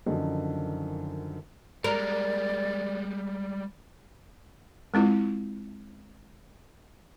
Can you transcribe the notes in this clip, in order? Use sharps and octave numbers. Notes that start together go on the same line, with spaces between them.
F#2 D3 D#3 F3 D#4
G3 G#3 A#4 D5
G#3 C4 E4 F4